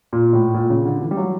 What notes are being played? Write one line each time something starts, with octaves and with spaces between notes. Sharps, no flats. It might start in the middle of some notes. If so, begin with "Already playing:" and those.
A#2
A2
A#2
C#3
D3
E3
G3
F#3